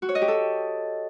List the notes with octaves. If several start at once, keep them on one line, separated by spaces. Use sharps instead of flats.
F#4
C#5
D#5
G4
A4